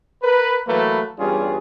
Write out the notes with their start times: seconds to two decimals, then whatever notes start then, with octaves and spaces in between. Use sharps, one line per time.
0.23 A#4 B4
0.68 E3 F#3 A3 A#3 B4
1.19 E2 G2 G3 C#4 F4 G#4